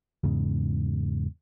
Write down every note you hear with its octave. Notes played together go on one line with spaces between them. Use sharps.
E2 G#2 C#3